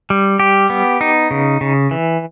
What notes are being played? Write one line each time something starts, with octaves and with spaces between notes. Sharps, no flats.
G3
G4
B3
D#4
C#3
C#3
E3